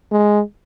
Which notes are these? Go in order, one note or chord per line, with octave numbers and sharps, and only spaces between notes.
G#3